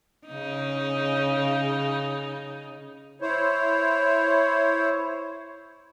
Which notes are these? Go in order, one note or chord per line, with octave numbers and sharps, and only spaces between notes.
C#3 D#4
E4 C5 C#5